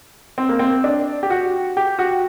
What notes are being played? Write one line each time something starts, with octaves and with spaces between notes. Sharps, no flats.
C4
A#3
C4
D4
G4
F#4
G4
F#4